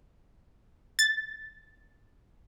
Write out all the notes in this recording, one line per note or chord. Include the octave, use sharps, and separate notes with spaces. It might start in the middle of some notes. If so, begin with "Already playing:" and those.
A6